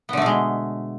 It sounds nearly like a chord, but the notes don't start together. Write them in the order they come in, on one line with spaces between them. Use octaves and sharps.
B3 D3 A3 B2 G#3